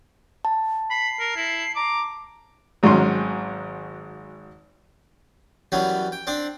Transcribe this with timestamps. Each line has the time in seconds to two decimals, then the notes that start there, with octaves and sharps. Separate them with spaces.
0.45 A5
0.90 B5 C7
1.20 A#4
1.36 E4
1.76 A#5 D6
2.83 G#1 G#2 F#3 C#4 C6
5.72 F#2 E3 G3 B3 C#4
6.12 G5
6.27 C4 D4 D5